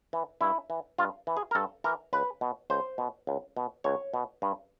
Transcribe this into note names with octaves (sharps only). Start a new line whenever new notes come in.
E3
G2 E4
E3
G2 F4
E3
G#4
A#4
G2 A4
E3 A#4
C#2 B4
B2
C#2 C5
B2
C#2
B2
C#2 C#5
B2
G2